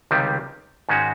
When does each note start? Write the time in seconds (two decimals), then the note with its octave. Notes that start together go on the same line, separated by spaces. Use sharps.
0.11 C#2 C3 D#3 G3
0.89 G#2 D#3 G#3 C#4 F#4